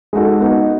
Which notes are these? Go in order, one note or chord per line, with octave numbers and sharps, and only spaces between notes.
G#3 D#4 F#4 A4
B3 D#4 F#4